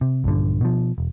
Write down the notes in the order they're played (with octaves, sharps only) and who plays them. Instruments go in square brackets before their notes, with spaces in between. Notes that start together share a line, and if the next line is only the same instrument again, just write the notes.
[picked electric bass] C3
A#1 G2 D3
B2 F3
E1